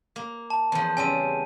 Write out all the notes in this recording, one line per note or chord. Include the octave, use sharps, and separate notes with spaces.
A#3
A5
E2 F3
C#3 G3 C4 G#5 D#7